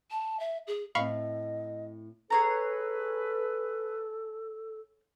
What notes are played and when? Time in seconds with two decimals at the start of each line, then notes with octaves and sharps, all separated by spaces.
0.11 A5
0.40 E5
0.67 G#4
0.95 A2 C4 D#5 F5 B5 C#6
2.30 G#4 A4 B4 C#5 A#5